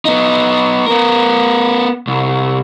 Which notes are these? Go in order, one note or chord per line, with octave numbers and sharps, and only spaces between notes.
B3 D#4
B3 A#4
C2